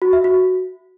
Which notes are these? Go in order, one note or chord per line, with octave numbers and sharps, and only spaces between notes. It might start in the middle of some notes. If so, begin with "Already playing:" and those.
F#4
E5
F#4